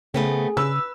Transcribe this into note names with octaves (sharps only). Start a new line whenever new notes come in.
C#3 A3 B3 C4 G#4
C#3 B4 E6